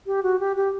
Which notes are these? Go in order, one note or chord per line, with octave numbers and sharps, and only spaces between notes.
G4
F#4
G4
G4